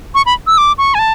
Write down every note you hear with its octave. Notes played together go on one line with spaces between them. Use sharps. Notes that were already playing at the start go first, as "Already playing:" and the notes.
C#6
B5
E6
D6
C#6
G#5
A5